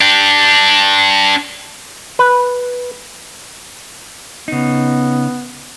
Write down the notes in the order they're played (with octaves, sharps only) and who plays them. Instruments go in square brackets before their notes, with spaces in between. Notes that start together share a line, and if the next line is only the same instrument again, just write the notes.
[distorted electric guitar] D4 G4
[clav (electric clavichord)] B4
[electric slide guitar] C#3 D#4 [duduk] B3